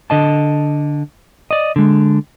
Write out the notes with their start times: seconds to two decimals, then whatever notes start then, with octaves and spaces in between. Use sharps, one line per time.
0.10 D3 D#5 A5
1.51 D5 D#5
1.76 D3 G#3